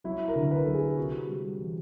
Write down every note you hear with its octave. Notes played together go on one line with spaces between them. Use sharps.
F#3 E4
A#4
D3
B4
F#3 A4
G#4
C3 F#4
G3
E3